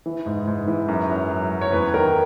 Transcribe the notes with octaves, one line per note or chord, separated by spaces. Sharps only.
E3
G#2
G#2
E3
F#2
F#3
F#3
F#3
C#5
E2 B4
D#3 A#4